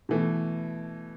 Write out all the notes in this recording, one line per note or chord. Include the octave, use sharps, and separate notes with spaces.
B2 E3 A3